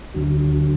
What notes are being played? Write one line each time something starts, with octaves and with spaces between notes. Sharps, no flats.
D2 D3 F#3